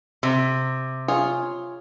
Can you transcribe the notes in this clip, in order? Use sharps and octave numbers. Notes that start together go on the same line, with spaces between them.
C3
F4 G#4 C#5